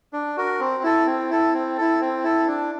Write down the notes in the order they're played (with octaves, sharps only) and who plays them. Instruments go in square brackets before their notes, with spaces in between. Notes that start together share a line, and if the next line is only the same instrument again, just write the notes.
[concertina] D4
F#4 A#4
C4
E4 A4
C4
E4 A4
C4
E4 A4
C4
E4 A4
D4